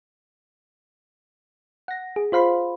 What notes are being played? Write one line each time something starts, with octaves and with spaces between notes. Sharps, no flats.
F#5 A#6
G#4
F4 C5 F5 B5 C6